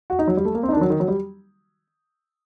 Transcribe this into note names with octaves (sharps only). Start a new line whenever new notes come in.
F#4
D#4
F#3
G3
A3
A#3
C4
D#4
D4
D#3
F#3
D#3
F#3
G3